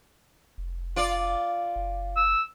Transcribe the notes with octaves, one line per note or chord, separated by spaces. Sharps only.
F1
F4 D5
F#1
E6